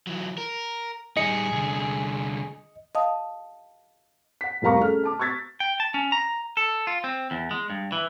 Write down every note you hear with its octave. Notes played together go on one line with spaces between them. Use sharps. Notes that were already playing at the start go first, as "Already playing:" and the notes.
E3 F#3
A#4
G3 D#4 G#4 D#5 C#7
C2 D3
D#5 F5 A5 D#6
F#5 B6
F1 G3 A#4 F5 A#5 C#6
C#3 G#4 A4 F6
A5 D6
C#6 E6 G#6 A6 B6
G5
A5
C#4
A#5
A4
F4
C4
E2
G#3
G2
E3